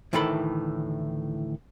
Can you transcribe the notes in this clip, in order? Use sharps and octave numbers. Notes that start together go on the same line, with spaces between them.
D2 A2 D#3 E3 A4 B5